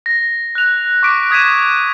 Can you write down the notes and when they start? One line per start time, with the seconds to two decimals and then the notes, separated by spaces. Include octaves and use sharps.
0.06 A#6
0.55 F#6 F7
1.03 C#6 D6 B6 D7
1.31 D#6 G#6 B6 D#7 E7